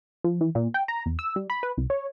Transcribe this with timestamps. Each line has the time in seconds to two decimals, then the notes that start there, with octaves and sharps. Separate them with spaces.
0.24 F3
0.41 E3
0.55 A#2
0.74 G5
0.88 A#5
1.06 E2
1.19 E6
1.36 G3
1.50 B5
1.63 B4
1.78 C2
1.90 C#5